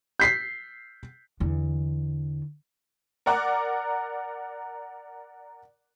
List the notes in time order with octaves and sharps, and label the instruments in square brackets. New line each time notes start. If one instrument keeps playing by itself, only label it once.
[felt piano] G6 B6 C7
[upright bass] E2 D3
[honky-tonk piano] A#4 D5 F#5 A#5 D6 F#6